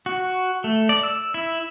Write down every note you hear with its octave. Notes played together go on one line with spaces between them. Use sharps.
F#4
A3
D5
E6
E4